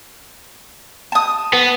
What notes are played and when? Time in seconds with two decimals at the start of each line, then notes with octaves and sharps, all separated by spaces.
1.12 A5 D#6
1.53 B3